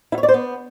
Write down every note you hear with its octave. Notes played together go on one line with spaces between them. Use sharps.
E4
C#5
D5
C5
B3